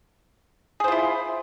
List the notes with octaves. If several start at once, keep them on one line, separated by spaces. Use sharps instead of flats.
E4 F4 G#4 C5